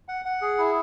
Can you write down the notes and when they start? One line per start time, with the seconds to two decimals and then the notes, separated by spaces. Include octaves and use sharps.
0.08 F#5
0.25 F#5
0.42 G#4
0.58 E4